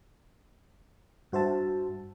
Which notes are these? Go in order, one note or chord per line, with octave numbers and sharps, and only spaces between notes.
G2 F#4 C5 E5 A5